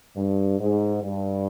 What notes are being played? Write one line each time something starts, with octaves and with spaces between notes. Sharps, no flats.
G2
G#2
G2